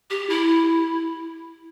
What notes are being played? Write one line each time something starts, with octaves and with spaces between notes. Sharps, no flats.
G4
E4